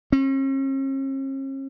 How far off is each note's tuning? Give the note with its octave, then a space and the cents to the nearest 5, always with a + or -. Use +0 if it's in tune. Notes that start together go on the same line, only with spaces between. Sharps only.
C#4 -45